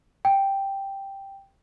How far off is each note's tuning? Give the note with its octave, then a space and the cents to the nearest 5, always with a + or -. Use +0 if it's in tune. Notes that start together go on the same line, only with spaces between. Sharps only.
G5 +0